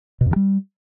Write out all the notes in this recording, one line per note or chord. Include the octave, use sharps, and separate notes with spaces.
B2
F2
D#3
G3